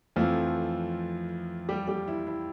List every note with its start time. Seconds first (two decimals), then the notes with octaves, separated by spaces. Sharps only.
0.16 F2 E3 F3 A3 F4
1.69 G3 G4
1.88 G3 G4
2.08 E4
2.27 E4